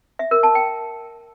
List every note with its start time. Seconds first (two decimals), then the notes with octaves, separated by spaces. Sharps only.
0.19 E5
0.31 A#4
0.43 A5
0.55 G5